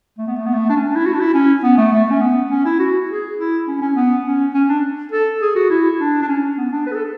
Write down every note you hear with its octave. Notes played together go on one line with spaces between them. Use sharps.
A3
B3
A3
B3
A3
D4
C#4
D4
E4
F#4
D4
E4
C#4
B3
A3
A3
C#4
B3
C#4
E4
F#4
G#4
E4
C#4
C#4
B3
C#4
C#4
D4
A4
G#4
F#4
E4
D4
D4
C#4
B3
D4
B4
G#4
A4